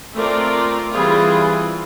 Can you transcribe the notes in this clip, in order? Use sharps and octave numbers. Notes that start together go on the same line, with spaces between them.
A3 C4 F4 A#4 D5
E3 G3 C4 F4 G#4